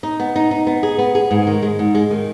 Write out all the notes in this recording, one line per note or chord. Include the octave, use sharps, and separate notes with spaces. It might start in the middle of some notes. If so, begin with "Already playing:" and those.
D#4
B3
D#4
D#4
B3
G#4
B3
G#4
G#2
D#3
G#3
G#2
G#3
D#3